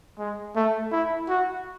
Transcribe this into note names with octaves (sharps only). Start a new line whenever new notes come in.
G#3
A3
E4
F#4